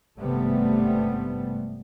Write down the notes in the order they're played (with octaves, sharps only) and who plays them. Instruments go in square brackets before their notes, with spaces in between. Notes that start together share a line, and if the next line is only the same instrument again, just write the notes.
[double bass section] G#1 G2 C3 G3 A3 B3